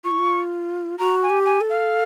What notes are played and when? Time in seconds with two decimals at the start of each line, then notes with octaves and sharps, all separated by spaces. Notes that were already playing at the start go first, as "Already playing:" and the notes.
0.04 F4 C#6
0.11 E4
0.19 F4
0.99 F#4 A#5
1.22 G#5
1.30 G4
1.45 G#5
1.61 A4
1.69 F5